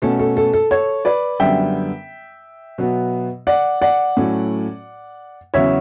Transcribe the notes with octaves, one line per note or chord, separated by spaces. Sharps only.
B2 A3 C#4 A4
A4
A4
A4
A4 C#5
B4 D5
F#2 D3 G3 B3 E5 G5
B2 F#3 B3
D5 F#5
D5 F#5
A2 F#3 A3 C#4
E2 C#3 F#3 C#5 E5